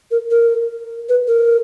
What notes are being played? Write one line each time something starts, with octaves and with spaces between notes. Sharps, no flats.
A#4
A#4
B4
A#4